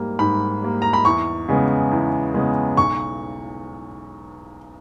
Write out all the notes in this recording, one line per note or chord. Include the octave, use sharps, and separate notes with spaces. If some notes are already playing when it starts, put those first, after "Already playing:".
Already playing: G#2 G3 A#3
G#2 B5
G3 A#3
A#5
B5
E2 C#6
C#3 G#3 B3
E2
C#3 G#3 B3
B1 C#6